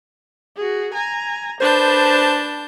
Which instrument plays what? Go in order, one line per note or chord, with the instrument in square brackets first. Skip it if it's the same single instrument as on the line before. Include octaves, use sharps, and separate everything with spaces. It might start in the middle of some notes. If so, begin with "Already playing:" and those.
[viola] F#4 G#4
G#5 A#5
[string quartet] D4 A5 G6 [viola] B4 [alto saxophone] C5